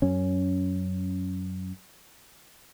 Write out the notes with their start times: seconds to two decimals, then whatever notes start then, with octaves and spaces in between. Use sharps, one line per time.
0.02 F#2 C#4